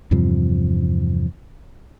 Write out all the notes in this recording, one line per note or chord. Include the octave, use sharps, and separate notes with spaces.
E2 G2 C3 F3